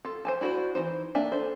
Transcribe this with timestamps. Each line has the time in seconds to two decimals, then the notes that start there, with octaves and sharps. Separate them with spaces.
0.05 F4 A4
0.25 C5 G#5 A5
0.41 D4 E4 F#4 A4 C5
0.75 E3 F3 D#4 C5
1.15 A#3 D4 E5 G#5
1.32 A4 C5